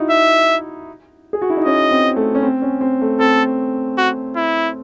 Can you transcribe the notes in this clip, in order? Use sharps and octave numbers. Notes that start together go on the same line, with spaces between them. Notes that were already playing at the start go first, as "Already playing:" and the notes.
Already playing: D#4 E4 F#4
E5
G#4
F#4
E4
D#4
C#4 D#5
C4
A3
C#4
C4
C#4
C4
A3
C4 A4
F#4
E4